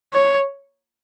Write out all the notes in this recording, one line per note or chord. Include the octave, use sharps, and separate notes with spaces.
C#5